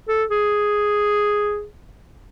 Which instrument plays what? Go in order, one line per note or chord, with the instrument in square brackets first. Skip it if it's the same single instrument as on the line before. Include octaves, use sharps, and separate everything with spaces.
[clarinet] A4
G#4